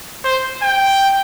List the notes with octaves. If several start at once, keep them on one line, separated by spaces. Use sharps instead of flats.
C5
G5